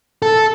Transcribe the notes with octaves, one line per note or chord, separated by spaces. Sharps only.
A4